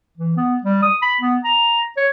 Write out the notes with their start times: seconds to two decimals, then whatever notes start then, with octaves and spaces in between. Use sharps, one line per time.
0.17 E3
0.37 B3
0.64 G3
0.82 D#6
1.02 B5
1.21 B3
1.44 A#5
1.97 C#5